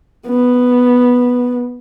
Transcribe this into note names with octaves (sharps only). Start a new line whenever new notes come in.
B3